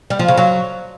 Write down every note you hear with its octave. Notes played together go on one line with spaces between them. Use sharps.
G3
F3
C#3
F#3